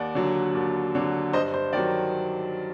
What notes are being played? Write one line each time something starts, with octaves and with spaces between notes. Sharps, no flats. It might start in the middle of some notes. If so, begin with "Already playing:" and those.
Already playing: D#2 D5 F#5
D3 F#3
D#2
D3 F#3
G2 C5 D#5
C5
D#3 F#3 D5